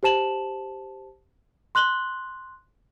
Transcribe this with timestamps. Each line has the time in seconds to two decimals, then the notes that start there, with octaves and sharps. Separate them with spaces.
0.03 G4 C5 A5 E7 F#7
1.75 C6 F#6 F#7 G7